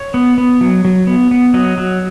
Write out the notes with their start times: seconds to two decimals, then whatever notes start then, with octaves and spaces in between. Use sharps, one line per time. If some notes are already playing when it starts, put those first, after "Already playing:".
Already playing: C#5
0.14 B3
0.38 B3
0.61 F#3
0.85 F#3
1.07 B3
1.31 B3
1.54 F#3 D#5
1.78 F#3